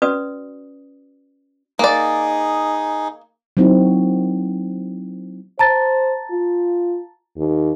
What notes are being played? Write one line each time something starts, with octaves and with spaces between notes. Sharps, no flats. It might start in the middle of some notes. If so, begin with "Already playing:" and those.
C#4 F#4 B4 D5 D#6
A#3 D#4 G#4 D5
F#3 A#3 C4 D#4 E4 F#4
C5 A5 A#5 A6
F4
D#2